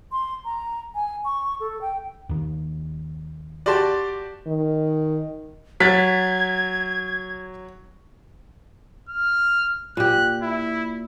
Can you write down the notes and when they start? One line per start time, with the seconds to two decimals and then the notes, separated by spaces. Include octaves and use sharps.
0.12 C6
0.45 A#5
0.95 G#5
1.25 C#6
1.60 A4
1.81 G5
2.29 D#2 D#3
3.66 F#4 G4 D5 A5 C6
4.47 D#3
5.80 F#3 G#6 A6 B6
9.09 F6
9.97 A#2 G4 F#6
10.42 E4